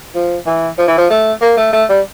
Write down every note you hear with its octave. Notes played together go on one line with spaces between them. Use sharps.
F3
E3
F3
E3
F3
A3
A#3
A3
A3
G3